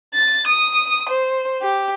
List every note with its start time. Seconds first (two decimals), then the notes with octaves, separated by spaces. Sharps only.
0.14 A6
0.47 D#6
1.10 C5
1.62 G4